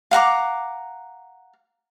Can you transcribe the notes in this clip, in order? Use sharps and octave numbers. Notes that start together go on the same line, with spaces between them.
F5 F#5 A#5 D6